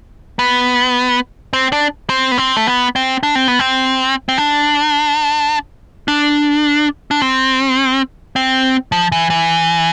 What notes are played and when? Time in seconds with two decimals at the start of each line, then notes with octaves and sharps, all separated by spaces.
0.39 B3
1.53 C4
1.72 D4
2.09 C4
2.32 B3
2.38 C4
2.57 A3
2.67 B3
2.96 C4
3.23 D4
3.35 C4
3.48 B3
3.59 C4
4.29 C4
4.38 D4
6.08 D4
7.11 D4
7.22 C4
8.36 C4
8.92 F3
9.12 E3
9.30 E3